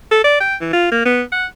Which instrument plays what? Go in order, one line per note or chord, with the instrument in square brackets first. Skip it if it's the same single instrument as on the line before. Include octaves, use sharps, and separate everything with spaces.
[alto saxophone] A4
D5
G5
E3
F4
A#3
B3
F#5